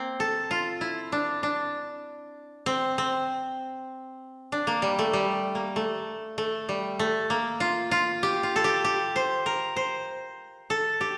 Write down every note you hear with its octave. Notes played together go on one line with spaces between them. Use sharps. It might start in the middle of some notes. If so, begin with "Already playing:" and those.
Already playing: A#3 C4
A4
F4
E4
D4
D4
C4
C4
D4
A#3
G3
A3
G3
A#3
A3
A3
G3
A3
A#3
F4
F4
G4
F4
A4
G4
G4
C5
A#4
C5
A4
G4